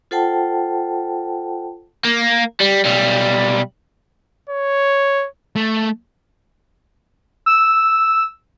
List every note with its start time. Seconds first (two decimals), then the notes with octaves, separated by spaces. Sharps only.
0.11 F4 A4 C5 F#5 G5 A5
2.05 A#3
2.61 G3
2.85 B1 G3
4.49 C#5
5.56 A3
7.46 E6